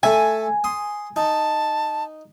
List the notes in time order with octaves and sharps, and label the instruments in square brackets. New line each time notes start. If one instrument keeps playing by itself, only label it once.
[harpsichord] A3 E5 [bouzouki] G#5
[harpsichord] C6 D#6
[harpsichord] D#4 [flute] A5